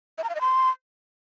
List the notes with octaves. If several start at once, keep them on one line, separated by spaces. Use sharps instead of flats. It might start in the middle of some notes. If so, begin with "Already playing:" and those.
E5
A#5
F5
D#5
C6